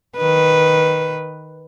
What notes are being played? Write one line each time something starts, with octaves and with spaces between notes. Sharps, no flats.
D#3 B4